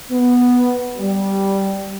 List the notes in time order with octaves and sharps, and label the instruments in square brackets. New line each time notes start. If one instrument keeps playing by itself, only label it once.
[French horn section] B3
G3